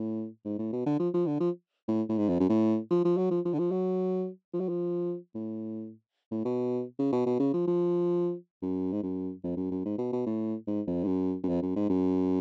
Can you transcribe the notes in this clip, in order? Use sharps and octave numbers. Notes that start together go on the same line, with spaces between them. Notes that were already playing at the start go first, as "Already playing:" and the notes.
Already playing: A2
G#2
A2
B2
D3
F3
F3
D3
F3
A2
A2
G#2
F2
F#2
A2
F3
F3
F#3
F3
F3
D3
F3
F#3
F3
F#3
F3
A2
A2
B2
C#3
B2
B2
C#3
F3
F3
F#2
G#2
F#2
F2
F#2
F#2
G#2
B2
B2
A2
G#2
F2
G#2
F#2
F#2
F2
F#2
G#2
F#2